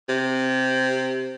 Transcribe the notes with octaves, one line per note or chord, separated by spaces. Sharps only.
C3